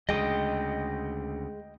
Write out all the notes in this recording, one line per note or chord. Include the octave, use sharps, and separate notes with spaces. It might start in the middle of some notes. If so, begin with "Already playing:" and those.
D2 C#3 G#3 D#5 G5 D#6